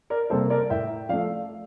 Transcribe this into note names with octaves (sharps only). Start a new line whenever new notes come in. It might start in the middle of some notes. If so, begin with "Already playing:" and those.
A#4 D5
C3 G3 A#3 A4 C5
A#4 D5
A2 E5 G5
F3 A3 D5 F5